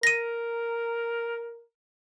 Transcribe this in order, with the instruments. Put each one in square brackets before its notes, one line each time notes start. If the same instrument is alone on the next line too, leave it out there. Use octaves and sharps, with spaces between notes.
[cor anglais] A#4 [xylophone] A#6 D#7